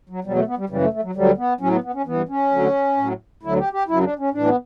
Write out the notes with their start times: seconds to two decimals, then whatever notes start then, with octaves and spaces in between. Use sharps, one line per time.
0.09 F#3
0.24 E2 B2 F#3 G3
0.36 A3
0.47 B3
0.58 G3
0.69 F#2 C#3 E3 G3
0.81 A3
0.93 A3
1.03 F#3
1.15 D2 D3 F#3 G3
1.38 B3
1.61 A2 F#3 C#4
1.72 B3
1.84 B3
1.94 C#4
2.06 G2 E3 B3
2.29 C#4
2.51 D2 D3 F#3
2.97 A2 F#3
3.43 D2 D3 F#3 E4
3.59 G4
3.73 G4
3.88 F#2 C#3 F#3 E4
4.04 D4
4.19 C#4
4.33 A2 E3 D4
4.45 B3